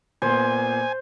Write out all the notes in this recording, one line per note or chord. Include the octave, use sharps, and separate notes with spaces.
A#2 B3 C5 G#5